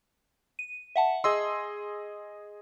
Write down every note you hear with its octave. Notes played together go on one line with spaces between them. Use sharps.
D#7
E5 F#5 A5
G#4 D#5 C6 E6